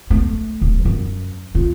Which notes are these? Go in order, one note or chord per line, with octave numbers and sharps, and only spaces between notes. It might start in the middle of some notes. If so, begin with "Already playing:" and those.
A3
D1
F#2
F4